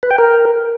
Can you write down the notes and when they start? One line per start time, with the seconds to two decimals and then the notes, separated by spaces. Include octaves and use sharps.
0.03 B4
0.11 G5
0.18 A#4